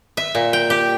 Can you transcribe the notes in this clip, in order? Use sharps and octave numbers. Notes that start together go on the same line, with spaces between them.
E5
A#2
G5
G4